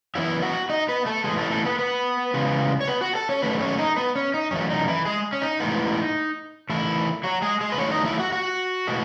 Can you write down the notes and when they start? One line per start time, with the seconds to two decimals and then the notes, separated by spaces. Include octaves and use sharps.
0.15 F#2 E3 B3 E4 E5
0.43 F#4 F#5
0.70 D#4 D#5
0.89 B3 B4
1.06 A3 A4
1.24 A2 E3 G#3 B3 G#4
1.38 A3 A4
1.51 A3 A4
1.65 B3 B4
1.79 B3 B4
2.34 C#3 E3 G#3 B3
2.81 C#5
2.87 B3 B4
3.01 F#4 F#5
3.15 A4 A5
3.29 C#4 C#5
3.42 F#2 D#3 A3 B4
3.61 C#4 C#5
3.78 D#4 D#5
3.96 B3 B4
4.16 C#4
4.34 D#4
4.51 F#2 E3 A3 C#4
4.70 D#4
4.88 E3 E4
5.05 G#3 G#4
5.33 C#4
5.42 D#4
5.60 A2 E3 G#3 B3
6.70 E2 D#3 E3 A3 E4
7.23 F#3 F#4
7.42 G#3 G#4
7.61 G#3 G#4
7.72 B4
7.78 E2 D#3 F#3 A3 C#4 C#5
7.92 D#4 D#5
8.05 E4 E5
8.19 F#4 F#5
8.32 F#4 F#5
8.87 A2 G#3 B3